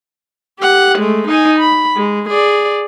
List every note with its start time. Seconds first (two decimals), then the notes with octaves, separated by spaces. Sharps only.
0.59 G4 F#5
0.98 G#3 A3
1.28 D#4 G#5
1.59 B5
1.96 G#3
2.29 G#4 D5